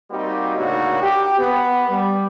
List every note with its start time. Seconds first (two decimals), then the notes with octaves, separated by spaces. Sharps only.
0.10 G3 A#3 C4 D#4 F#4 G4
0.56 A2 C#3 A#3 D4 D#4 F#4
1.01 G4
1.38 B3
1.89 G3